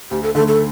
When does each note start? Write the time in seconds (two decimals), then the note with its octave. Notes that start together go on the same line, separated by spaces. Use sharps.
0.11 D2 G4
0.23 A4
0.35 D3 A3 A4
0.48 A4